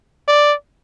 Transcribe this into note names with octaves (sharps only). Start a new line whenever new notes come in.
D5